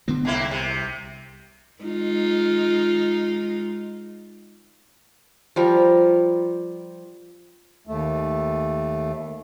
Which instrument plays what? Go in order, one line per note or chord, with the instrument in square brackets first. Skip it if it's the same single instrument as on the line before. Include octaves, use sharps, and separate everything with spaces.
[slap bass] D3 B3 C4
[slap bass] C2 [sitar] G#2 A#3 E4
[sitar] C3
[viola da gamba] G#3 D#4 F4
[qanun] F3 G3 A#4
[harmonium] D#2 A3